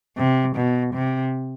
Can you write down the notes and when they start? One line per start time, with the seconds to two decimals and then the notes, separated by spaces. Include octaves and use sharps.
0.18 C3
0.56 B2
0.94 C3